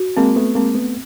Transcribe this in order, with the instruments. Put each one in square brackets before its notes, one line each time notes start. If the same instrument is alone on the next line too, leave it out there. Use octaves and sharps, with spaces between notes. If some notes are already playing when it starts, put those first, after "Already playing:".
Already playing: [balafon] F#4
[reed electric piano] G#3 A#3 [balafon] C4
[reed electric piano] A3 B3
[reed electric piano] G#3 A#3 [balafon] C4
[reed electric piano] A3 B3